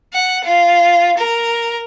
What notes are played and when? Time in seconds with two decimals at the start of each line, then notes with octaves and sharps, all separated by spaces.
0.13 F#5
0.44 F4
1.17 A#4